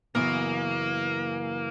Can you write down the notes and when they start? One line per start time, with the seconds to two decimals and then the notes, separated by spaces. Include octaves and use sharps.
0.15 F#2 C#3 E3 A#3 B3